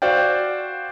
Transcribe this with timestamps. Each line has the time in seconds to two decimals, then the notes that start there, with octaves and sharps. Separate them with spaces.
0.02 F#4 C5 D5 F5 G5